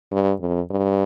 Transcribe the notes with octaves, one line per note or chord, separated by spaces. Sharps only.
G2
F2
G2